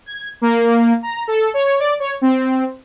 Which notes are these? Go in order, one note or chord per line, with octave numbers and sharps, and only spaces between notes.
G#6
A#3
A#5
A4
C#5
D5
C#5
C4